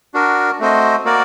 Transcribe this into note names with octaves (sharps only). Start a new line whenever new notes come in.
D4 F#4 A#4
A3 C4 F#4 C5 D#5
A#3 F#4 A#4 D5